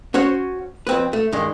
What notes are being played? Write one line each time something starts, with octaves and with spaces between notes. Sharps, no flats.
C#4 F#4 C5 C#5
F2 C4 B4
A3
G2 D#3 G#3